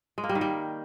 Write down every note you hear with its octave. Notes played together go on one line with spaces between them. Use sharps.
G#3
A#3
G3
D#3
G3